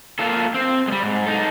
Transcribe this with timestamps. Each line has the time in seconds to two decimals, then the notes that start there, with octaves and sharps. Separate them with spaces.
0.19 A#3 F4 A4
0.54 C4
0.88 G3 G#3
1.03 G#2
1.26 D#4 A4